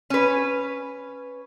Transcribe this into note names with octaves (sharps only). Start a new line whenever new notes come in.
C#4 B4